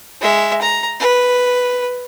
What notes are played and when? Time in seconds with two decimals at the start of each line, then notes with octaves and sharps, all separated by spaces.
0.22 G#3 E5
0.62 A#5
1.00 B4